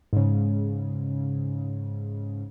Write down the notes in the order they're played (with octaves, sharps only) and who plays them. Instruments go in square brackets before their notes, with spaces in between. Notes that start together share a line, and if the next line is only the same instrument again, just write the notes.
[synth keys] G#2 C#3